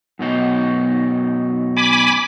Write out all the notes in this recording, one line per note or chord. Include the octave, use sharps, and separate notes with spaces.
F#2 B2 D#4
G#5 B5 D6